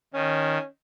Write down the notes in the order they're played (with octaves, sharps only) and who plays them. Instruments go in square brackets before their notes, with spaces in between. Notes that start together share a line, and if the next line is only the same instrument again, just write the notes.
[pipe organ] D#3 [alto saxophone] C#4